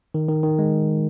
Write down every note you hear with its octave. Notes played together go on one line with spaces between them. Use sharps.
D#3
D#3
D#3
G#3